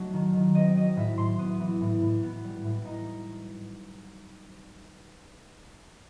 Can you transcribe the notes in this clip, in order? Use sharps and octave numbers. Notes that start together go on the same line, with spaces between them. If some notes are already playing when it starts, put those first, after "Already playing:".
Already playing: F#3 A3 D#4
D#3
D#3
C4 D#5
F#3 D#5
A2 E5
A2 C6
B3 D#6
E3
A2
A2
B3
G3
A2
D#4